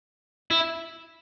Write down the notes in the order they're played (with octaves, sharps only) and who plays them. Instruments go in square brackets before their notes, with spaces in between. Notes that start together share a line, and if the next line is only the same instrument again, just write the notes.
[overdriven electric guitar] E4